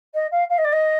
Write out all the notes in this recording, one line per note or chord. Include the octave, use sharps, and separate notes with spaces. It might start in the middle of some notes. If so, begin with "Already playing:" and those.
D#5
F5
F5
D#5
D5
D#5